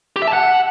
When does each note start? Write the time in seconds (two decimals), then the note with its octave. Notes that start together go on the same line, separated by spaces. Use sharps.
0.16 G4
0.22 E5
0.27 A5
0.33 F#5